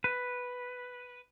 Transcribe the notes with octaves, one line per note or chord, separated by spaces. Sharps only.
B4